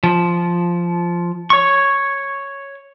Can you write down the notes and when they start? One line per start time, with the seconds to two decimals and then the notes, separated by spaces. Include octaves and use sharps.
0.04 F3
1.50 C#5 C#6